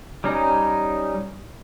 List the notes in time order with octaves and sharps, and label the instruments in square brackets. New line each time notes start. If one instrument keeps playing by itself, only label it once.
[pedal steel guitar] G3 C#4 D#4